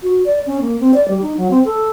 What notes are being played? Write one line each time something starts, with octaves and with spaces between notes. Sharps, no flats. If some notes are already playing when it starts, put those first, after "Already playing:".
F#4
D5
C#4
A#3
C4
D5
G3
D#4
F#3
C4
A4